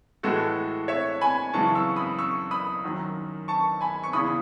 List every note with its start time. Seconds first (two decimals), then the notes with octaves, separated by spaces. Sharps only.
0.23 A2 E3 G#3 F#4 A4
0.88 C#5 E5
1.21 G#5 B5
1.53 F#2 C#3 E3 G#3 A5 C#6
1.75 C#6 E6
1.96 B5 D#6
2.19 C#6 E6
2.51 B5 D#6
2.84 F#2 D#3 F#3
3.48 A5 C#6
3.81 G#5 B5
4.04 C#6
4.13 E2 C#3 E3 B5 D#6